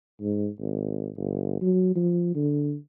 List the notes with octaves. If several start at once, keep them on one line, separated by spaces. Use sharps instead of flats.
G#2
G#1
G1
F#3
F3
D3